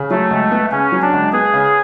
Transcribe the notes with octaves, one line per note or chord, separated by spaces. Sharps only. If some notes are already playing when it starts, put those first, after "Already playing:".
Already playing: C#3
F#3 A3
C#2
B3
C#3 C#4
F#3
D4
C#2
B3 G#4
C#3